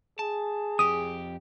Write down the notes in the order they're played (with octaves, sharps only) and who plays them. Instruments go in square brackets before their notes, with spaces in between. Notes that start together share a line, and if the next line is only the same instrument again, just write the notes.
[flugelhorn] G#4 [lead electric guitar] A5
[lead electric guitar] F2 G4 [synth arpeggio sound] D#6